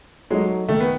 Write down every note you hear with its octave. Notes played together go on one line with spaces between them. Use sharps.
F#3 G#3 A3 D#4
D#3 A3
B3